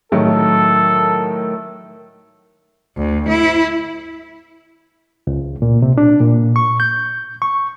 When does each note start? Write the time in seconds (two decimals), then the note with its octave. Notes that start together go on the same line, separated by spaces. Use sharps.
0.12 A2 D#3 F#3 A4
2.96 D2
3.28 E4
5.27 C#2
5.62 A#2
5.82 C3
5.98 D4
6.21 A#2
6.56 C#6
6.80 G6
7.42 C#6